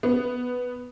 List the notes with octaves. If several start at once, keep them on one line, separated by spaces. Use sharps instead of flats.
B3